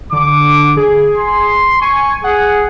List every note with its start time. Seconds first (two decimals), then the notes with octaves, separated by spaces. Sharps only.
0.12 D3 D6
0.77 G#4
1.17 C6
1.81 G#5 C#6
2.24 G#4 F#5